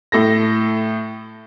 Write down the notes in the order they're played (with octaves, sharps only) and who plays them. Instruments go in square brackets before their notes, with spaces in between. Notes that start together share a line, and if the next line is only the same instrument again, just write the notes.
[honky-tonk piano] A2 A4 A#6